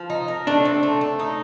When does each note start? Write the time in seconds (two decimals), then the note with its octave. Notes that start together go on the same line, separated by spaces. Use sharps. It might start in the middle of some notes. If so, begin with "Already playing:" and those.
Already playing: F3
0.10 D#4
0.28 A#4
0.47 A3 D4
0.65 C4
0.83 A3
1.01 A3
1.20 D#4